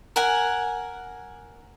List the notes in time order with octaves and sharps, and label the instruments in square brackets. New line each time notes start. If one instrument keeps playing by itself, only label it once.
[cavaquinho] A#4 F#5 G#5